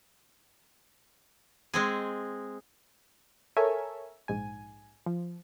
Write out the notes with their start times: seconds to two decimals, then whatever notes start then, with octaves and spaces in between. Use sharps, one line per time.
1.74 G#3 C4 G#4
3.57 A4 A#4 C#5 E5 G#5
4.28 A#1 G#2 G#5
5.06 F3